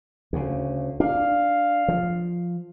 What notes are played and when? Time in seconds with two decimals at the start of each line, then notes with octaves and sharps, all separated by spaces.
0.33 D2 C#3
1.00 D4 F5
1.88 F3